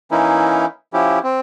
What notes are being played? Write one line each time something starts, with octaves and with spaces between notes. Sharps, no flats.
E3 A#3 C#4 D#4 E4
F3 C#4 E4 G4
C4